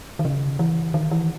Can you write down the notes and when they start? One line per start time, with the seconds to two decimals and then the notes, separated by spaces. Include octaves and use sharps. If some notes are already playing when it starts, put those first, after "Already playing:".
0.19 D#3
0.25 C#3
0.59 E3
0.94 D#3
1.11 E3